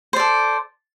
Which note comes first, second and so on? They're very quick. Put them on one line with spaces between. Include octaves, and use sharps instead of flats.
C5 D5 A4